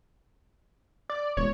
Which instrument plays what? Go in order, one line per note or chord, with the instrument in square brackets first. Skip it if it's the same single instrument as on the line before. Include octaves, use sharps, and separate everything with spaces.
[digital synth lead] D5
[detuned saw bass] E1 [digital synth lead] C#5